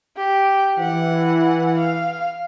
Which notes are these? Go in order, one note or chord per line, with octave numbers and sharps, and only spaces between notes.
G4
E3 F#5
F5